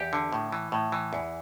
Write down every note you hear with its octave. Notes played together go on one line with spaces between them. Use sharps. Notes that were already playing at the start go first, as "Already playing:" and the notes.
Already playing: E2 G4
D3
A2
E3
A2
E3
E2